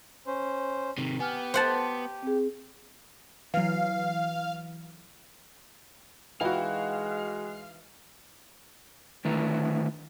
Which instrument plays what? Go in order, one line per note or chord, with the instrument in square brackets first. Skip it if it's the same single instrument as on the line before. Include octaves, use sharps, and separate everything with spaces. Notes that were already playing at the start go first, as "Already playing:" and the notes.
[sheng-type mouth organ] C#4 C5
[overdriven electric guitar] C3 D#3
[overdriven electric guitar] B3 [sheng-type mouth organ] G4 [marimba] G#5 F6
[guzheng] C5 F#5 A5
[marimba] C4 G#4
[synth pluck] E3 F#3 [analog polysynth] F5
[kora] E3 D#4 E4 [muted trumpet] G#3 [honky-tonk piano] F#4 G5 [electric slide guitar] F5
[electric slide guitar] D3 D#3 A3 E4 B4 A#5